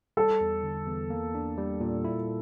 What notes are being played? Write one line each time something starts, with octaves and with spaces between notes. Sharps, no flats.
G3 A4
E2
D3
E2
A#3
D4
G3
A#2
E4